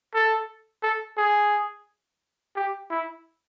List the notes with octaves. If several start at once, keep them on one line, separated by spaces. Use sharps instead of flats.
A4
A4
G#4
G4
E4